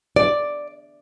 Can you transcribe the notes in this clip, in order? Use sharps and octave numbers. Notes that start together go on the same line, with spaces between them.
D5